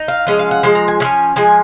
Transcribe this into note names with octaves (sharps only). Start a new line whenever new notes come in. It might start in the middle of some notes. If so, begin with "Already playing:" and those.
Already playing: D#4
F5
F3 G#3 C#4 D#5
F5
F#5
F3 G#3 G#5
A#5
G#5
F3 G#3 C#4
F3 G#3 G#5